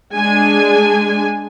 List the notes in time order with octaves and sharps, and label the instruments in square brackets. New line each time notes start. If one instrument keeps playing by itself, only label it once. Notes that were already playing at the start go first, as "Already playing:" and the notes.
[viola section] G#3 D4 G#5